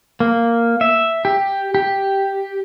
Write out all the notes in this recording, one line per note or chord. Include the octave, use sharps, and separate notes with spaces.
A#3
E5
G4
G4